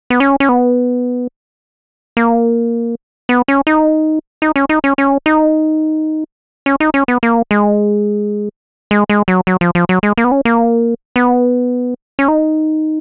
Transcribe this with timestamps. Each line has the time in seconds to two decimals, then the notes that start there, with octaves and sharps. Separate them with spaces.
0.10 B3
0.20 C#4
0.40 C#4
0.49 B3
2.17 A#3
3.29 B3
3.48 C#4
3.67 D#4
4.42 D#4
4.56 C#4
4.69 D#4
4.84 C#4
4.98 C#4
5.26 D#4
6.66 C#4
6.80 D#4
6.94 C#4
7.08 B3
7.23 A#3
7.51 G#3
8.91 G#3
9.09 G#3
9.28 F#3
9.47 F#3
9.61 F3
9.75 F3
9.89 F#3
10.03 G#3
10.18 A#3
10.24 B3
10.31 C#4
10.45 A#3
11.16 B3
12.19 C#4
12.28 D#4